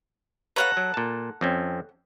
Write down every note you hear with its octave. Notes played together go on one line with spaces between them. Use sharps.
A4 B4 C#5 F5 F#5 A#5
F#3
A#2 A5
F2 C4 C#4